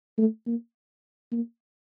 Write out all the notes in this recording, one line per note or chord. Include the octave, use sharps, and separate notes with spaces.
A3
A#3
A#3